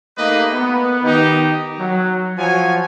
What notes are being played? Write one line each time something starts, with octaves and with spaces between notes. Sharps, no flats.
A3 A#3 D#4 G4 B4 D#5
B3
D#3 D#4 G4
F#3
F3 F#3 F#4 C#5 G#5